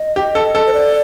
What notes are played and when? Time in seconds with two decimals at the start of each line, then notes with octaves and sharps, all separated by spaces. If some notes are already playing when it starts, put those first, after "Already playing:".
Already playing: D#5
0.16 G4
0.35 A4
0.55 A4
0.67 C5
0.73 D5